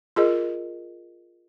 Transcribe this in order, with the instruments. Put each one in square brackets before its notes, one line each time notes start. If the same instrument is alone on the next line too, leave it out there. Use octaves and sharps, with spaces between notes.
[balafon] F4 G#4 A#4 D#5